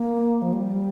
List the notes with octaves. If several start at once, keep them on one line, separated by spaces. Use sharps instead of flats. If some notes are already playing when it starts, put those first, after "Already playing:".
Already playing: A#3
F3
G3